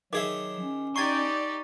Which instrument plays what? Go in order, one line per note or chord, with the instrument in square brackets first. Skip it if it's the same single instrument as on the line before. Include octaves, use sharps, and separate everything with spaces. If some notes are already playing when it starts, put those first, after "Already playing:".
[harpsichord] D#3 G#4 E5 [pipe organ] F#3 [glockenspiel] D6 G7
[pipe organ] C#4
[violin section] D#4 G4 D5 [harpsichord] G#5 C6 [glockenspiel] C#6 A6